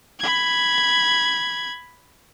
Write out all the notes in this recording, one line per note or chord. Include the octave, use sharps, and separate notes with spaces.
B5 G#6